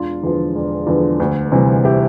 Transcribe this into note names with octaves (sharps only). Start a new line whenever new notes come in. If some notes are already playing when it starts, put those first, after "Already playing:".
Already playing: E1 D4 F4
E2 D3 F3
E1
E2 D3 F3
D2
C3 E3 G3
E4 G4